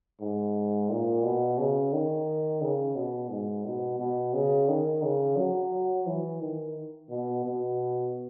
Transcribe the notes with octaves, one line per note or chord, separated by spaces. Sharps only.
G#2
A#2
B2
C#3
D#3
C#3
B2
G#2
B2
B2
C#3
D#3
C#3
F#3
E3
D#3
B2
B2